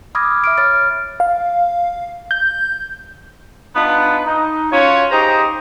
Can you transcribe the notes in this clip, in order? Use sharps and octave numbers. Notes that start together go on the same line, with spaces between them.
B5 D6 D#6 F6 G#6 A#6
E5 F6 D7
C#5 B5 F6 A6
F5
G6
B3 D4 D#4 F4 B4
D#4
C#4 F4 F#4 C#5
D#4 G4 G#4 C5 A#5